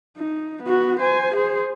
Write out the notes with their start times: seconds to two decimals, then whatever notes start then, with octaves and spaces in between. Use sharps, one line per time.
0.17 D#4
0.63 B3 F#4
1.00 C5 G#5
1.35 G#4 C5